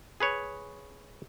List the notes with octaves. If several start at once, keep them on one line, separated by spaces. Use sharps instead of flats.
G#4 B4 C#5